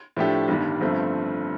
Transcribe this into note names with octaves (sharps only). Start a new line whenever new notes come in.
A2 F3 A3 D4 G4
G1 G2 D#3 G3 D4
G1 G2 F3 A3 C4